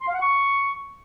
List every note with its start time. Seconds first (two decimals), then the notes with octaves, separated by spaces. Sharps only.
0.01 C6
0.08 F5
0.14 F#5
0.21 C#6